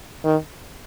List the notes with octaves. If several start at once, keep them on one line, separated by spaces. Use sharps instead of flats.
D#3